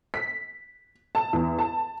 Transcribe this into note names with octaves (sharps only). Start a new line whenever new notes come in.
B6
A5
E2
A5